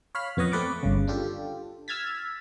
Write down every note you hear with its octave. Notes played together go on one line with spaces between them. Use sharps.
C#5 F5 B5 F6
F2 B3 C#5 D#5 F#5
A3 C4 B4 D5 C#6 D6
G1 C#3
D4 F4 G4 A4
E6 F6 G#6 A6 B6